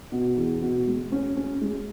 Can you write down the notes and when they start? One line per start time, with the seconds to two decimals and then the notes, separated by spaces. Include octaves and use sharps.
0.12 B2
0.37 E2
0.62 B2
0.87 G#3
1.12 C#4
1.37 C#4
1.61 G#3